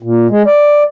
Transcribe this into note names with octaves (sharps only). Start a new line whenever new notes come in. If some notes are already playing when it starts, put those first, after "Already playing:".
A#2
G#3
D5